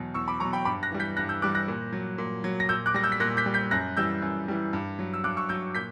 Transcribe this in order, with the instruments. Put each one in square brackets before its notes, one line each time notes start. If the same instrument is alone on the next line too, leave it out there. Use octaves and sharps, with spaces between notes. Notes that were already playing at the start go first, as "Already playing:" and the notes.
Already playing: [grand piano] E2 B2 F#3
E2 C#6 E6
B5 D6
B2 F#3 A#5 C#6
G5 B5
G2 B5 D6
F#6 A#6
E3 G3
G6 B6
G2 F#6 A#6
E6 G6
E3 G3 D6 F#6
F#6 A#6
A#2
F#3
A#2
F#3
A#6
A#2 E6 G6
D6 F#6
G3 A#6
E6 G6
B6
A#2 F#6 A#6
G6 B6
G3
G6 B6
F#2 F#6 A#6
E3 G3 E6 G6
F#2
E3 G3
G2
F#3
E6
G2 D6 F#6
C#6 E6
F#3 E6 G6
A#2 G6 B6